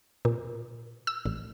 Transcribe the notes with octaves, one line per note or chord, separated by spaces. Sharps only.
A#2
E6
A1